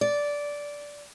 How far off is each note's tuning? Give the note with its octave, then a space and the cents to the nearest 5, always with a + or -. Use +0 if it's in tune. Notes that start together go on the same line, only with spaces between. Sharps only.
D5 -10